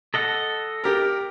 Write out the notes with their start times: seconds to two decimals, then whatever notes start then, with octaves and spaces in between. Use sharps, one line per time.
0.14 A4 D#5 F#5
0.84 G4 A#4